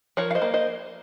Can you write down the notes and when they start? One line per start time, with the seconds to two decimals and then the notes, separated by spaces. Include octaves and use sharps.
0.17 F3 A#4 C#5
0.31 F5
0.35 C5 D#5
0.42 A#3
0.54 C5 D#5